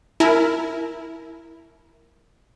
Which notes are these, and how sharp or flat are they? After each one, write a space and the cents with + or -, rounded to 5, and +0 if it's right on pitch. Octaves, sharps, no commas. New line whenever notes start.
E4 +0 A#4 +0 G#5 +45